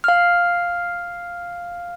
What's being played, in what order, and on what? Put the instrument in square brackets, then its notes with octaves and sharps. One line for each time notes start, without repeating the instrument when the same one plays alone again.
[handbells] F5 F6